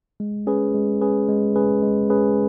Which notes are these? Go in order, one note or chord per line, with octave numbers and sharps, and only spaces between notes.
G#3
C#4 G#4 B4
G#3
C#4 G#4 B4
G#3
C#4 G#4 B4
G#3
C#4 G#4 B4